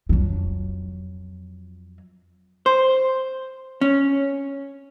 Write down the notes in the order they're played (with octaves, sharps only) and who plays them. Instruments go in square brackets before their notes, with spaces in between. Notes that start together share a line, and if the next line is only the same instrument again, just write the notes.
[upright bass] F2 F#3
[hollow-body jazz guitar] C5
C#4